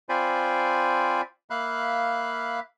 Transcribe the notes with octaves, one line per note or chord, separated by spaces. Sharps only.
C4 F4 C5 D5 G#5 B5
A#3 E5 F5 B5 F#6